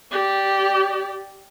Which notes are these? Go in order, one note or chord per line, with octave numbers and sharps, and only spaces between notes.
G4 D5